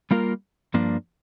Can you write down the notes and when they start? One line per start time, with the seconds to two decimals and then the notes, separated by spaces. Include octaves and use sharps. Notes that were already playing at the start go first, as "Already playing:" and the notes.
0.11 G3 A#3 F4 A#4
0.74 G2 F3 A#3 D4